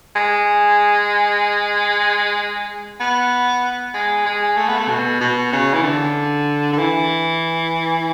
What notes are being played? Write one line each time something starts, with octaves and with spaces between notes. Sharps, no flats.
G#3
B3
G#3
G#3
A3
B3
A3
B2
B2
C#3
E3
D3
D3
E3